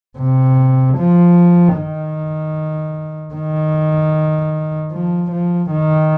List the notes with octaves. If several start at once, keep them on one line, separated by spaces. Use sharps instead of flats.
C3
F3
D#3
D#3
F3
F3
D#3